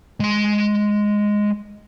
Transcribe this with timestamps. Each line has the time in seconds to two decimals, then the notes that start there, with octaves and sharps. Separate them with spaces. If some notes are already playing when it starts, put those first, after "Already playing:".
0.20 G#3 C6